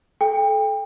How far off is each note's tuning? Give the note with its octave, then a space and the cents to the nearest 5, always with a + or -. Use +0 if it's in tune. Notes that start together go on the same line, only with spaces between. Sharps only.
A4 -30 G5 +30